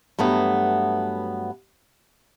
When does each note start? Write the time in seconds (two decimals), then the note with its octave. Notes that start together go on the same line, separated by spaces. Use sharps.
0.19 G2 F#3 A3 B3